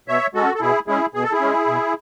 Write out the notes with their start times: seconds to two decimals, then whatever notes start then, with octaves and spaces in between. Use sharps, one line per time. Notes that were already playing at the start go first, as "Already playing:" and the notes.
0.08 B2 C#5 E5
0.34 G#3 C#4 F#4 A4
0.55 A4
0.61 B2 E4 G#4
0.88 G#3 C#4 E4 G#4
1.14 B2 G#4
1.23 A4
1.32 E4 G#4
1.41 G#3 C#4
1.67 B2